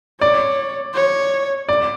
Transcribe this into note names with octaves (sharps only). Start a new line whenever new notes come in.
C#5 D5
C#5
D5